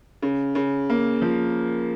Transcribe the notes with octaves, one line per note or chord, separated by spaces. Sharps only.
C#3
C#3
A#3
F3